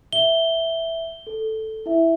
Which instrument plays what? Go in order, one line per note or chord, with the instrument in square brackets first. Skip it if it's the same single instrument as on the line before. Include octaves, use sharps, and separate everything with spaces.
[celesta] E5 [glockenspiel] G7
[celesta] A4
E4 E5